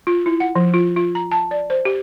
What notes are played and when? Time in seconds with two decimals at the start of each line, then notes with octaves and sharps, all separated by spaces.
0.07 F4
0.26 E4
0.40 F#5
0.55 F3
0.74 F4
0.96 F4
1.15 A#5
1.31 A5
1.51 D5
1.70 C5
1.85 G4